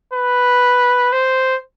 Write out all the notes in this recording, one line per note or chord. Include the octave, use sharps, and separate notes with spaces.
B4
C5